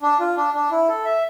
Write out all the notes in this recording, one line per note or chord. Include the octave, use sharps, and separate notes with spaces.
D4
F4
D4
D4
E4
A4
E5